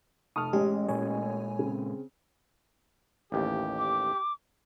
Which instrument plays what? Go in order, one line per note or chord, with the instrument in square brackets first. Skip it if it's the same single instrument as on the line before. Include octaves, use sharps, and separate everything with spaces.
[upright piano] F1 A5 C#6 [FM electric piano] D#6 F6
[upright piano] A1 C#4 [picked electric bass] G#3 [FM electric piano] G4
[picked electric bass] A#2 G#3 [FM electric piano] C#5 G#5
[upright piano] C#3 C4
[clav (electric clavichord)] A1 D#2 [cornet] G4
[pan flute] D6